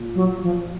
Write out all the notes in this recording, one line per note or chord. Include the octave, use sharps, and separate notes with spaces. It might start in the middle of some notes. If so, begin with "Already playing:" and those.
Already playing: A#2
F#3
F3